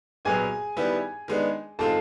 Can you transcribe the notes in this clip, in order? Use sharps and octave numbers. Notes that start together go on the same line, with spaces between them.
C2 A#2 F#3 B3 G#4 G#5
D#3 G3 B3 E4 G4
D#3 G#3 B3 D4
D#3 G#3 C4 F4 A4 A5